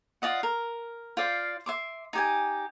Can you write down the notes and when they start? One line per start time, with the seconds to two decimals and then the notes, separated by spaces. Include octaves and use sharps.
0.22 F4 D5 D#5 F#5
0.43 A#4
1.17 F4 C5 D5 F5
1.66 E5 C6 D6
2.13 D#4 G4 G#5